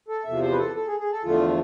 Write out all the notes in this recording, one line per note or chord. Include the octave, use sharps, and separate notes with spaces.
A4
E2 C3 F3 E5
C5
B4
A4
A4
G#4
G#4
A4
E2 D3 F3 A3 F4